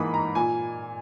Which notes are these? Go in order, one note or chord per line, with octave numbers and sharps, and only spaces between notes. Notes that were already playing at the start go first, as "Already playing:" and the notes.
Already playing: G#2 E3 A#3 D#4 B5 D#6
A#5
A#2 G#5